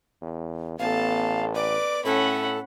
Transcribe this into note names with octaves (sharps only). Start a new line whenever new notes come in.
E2
A1 B3 A4 F5 A5
B4 D5 D6
A2 C#4 A4 F#5 B5